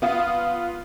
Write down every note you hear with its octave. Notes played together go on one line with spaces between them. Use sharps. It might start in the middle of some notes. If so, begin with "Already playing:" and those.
B3 F4 D#6